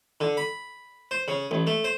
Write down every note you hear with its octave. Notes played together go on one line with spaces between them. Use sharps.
D3
B5
C5
C#3
A1
A3
C5